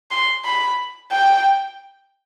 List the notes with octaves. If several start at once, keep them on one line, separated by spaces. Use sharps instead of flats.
C6
B5
G5